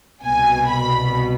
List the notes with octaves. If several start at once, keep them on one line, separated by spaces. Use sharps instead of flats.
C2 B2 G#5
B5